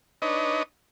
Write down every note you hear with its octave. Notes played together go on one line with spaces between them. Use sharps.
D4 D#4 B4 C#5 D#5